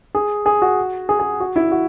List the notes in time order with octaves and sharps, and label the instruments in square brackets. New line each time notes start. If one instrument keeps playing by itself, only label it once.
[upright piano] G#4
G#4
F#4
G#4
G#4
F#4
E4
F#4